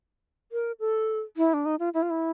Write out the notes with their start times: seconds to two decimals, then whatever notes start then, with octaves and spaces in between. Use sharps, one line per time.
0.52 A#4
0.80 A4
1.37 E4
1.54 D4
1.66 D#4
1.79 F4
1.94 E4
2.02 F4
2.10 E4